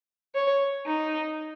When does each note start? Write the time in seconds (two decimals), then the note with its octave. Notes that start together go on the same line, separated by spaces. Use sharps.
0.35 C#5
0.86 D#4